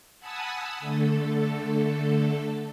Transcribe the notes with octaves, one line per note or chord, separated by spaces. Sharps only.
F#5 G#5 A5 B5 D#6 E6
D3 A3 A4